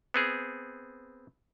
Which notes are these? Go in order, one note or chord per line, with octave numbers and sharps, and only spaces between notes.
B3 C4 G#4